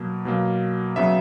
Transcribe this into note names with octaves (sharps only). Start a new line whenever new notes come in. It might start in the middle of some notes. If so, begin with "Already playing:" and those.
Already playing: B2 F#3 A#3
B2 F#3 A#3
C#3 F#3 B3 E5